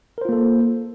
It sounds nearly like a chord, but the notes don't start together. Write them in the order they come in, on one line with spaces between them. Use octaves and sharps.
A#4 C5 F4 A#3 A4